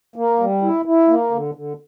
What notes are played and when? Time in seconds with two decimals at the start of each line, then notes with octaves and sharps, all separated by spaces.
0.16 A#3
0.39 G3
0.62 E4
0.85 E4
1.08 A#3
1.31 D3
1.55 D3